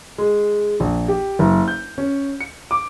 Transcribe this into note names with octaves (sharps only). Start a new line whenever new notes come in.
G#3
A#1
G4
F#1
G6
C#4
C#7
D6